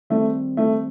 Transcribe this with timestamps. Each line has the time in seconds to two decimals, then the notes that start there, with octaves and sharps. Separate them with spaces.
0.10 D#3 G3 A3 C4
0.57 A3